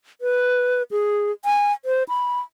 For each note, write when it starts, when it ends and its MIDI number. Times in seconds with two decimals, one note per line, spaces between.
0.21 0.83 71
0.91 1.32 68
1.45 1.73 80
1.85 2.03 72
2.09 2.40 83